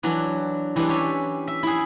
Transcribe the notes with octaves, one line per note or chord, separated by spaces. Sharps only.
E3 F#3 D4
E3 G3 G#3 D4
C#4 G4 E5
E5
E4 G#4